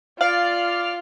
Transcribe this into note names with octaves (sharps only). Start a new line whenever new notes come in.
F4 D5 F5 F6 C7